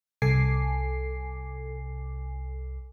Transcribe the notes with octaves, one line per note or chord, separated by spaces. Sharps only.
C2 A4 G#5 D6 C7